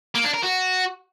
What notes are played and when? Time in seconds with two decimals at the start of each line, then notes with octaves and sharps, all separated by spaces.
0.15 A#3
0.24 D4
0.34 A#4
0.43 F#4